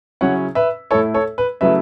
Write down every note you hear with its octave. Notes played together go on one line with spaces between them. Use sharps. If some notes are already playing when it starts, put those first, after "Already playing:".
C#3 F#3 C#4 E4 C#5 F#5
B4 E5
A2 A3 E4 A4 C#5
A4 C#5
B4
C#3 F#3 A3 E4 B4 E5